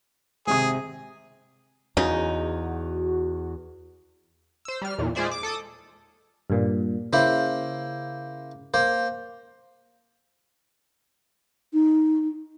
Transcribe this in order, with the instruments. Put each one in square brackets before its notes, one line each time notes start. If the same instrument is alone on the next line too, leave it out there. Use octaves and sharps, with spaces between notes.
[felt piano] G#1 C3 D#6 [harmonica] G#4
[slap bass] E2 [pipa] C#3 D#4 [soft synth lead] F#4
[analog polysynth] C5 E6
G3 F6
E2 A#2
G#3 F4 G#4 C5 D5 E5
D6
A4 D6 D#6
[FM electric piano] G2 A#2
[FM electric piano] C#3 [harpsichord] A#3 E4 C5
[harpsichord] A#3 C5
[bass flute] D#4